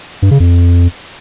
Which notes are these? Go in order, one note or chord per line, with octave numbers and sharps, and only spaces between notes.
G2
C#3
F2